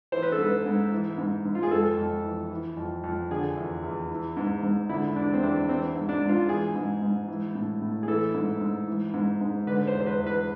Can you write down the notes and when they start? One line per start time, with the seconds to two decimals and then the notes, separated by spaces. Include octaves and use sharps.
0.12 E3 C5
0.23 B4
0.32 A4
0.39 G#2 B4
0.66 G#2
0.92 E3
1.18 G#2
1.45 G#2
1.55 F4
1.63 G#4
1.71 F2 A4
1.98 F2
2.24 E3
2.51 E3
2.77 F2
3.04 F2
3.31 D3 G#4
3.57 E2
3.83 E2
4.10 E3
4.37 G#2
4.63 G#2
4.89 D3 E4
5.16 E2 D4
5.33 C4
5.43 E2 D4
5.69 E3 C4
5.96 G#2
6.09 D4
6.22 G#2
6.29 F4
6.49 E3 G#4
6.75 G#2
7.02 G#2
7.28 E3
7.55 A2
7.82 A2
8.03 G#4
8.08 E3 A4
8.34 G#2
8.61 G#2
8.87 E3
9.14 G#2
9.41 G#2
9.67 D3 B4
9.87 C5
9.94 E2
10.00 C5
10.07 B4
10.20 E2
10.27 B4